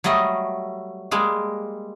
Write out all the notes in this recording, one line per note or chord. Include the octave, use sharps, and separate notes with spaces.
F#3 G3 A3 D#5
G3 G#3 A#3